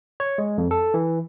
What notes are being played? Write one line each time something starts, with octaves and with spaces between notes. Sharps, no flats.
C#5
G#3
F2
A4
E3